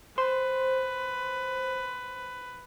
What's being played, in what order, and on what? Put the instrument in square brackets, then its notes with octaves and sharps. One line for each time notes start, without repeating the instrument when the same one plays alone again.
[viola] B4 [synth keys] C5